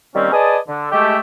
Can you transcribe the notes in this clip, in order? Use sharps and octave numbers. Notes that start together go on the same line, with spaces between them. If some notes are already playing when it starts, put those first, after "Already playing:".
D#3 G3 A#3 C4 C#4
G#4 B4 D5 D#5 G#5 A5
D3
G#3 A3 G4